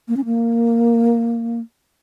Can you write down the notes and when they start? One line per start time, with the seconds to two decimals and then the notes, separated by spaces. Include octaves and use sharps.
0.08 A#3
0.17 C#4
0.25 A#3